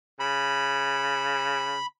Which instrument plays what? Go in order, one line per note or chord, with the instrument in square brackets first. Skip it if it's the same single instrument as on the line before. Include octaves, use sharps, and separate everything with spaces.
[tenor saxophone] C#3 [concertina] B5